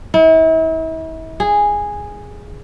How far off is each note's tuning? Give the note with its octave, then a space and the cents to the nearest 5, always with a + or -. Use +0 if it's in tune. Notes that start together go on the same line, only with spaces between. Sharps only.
E4 -40
G#4 -10